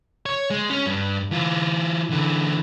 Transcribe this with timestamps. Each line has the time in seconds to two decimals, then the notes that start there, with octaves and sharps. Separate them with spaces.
0.26 C#5
0.50 G#3
0.70 C#4
0.86 G2
1.31 E3 F4
2.10 D3 E3